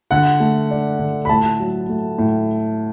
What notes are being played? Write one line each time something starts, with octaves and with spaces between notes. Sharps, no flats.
D3 F#5
A3
D4
D3
B5
A2 A5
F#3
A3
A2